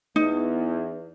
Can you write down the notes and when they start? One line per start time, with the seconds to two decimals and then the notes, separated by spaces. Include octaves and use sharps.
0.16 E2 D#4